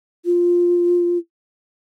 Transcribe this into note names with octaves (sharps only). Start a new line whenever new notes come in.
F4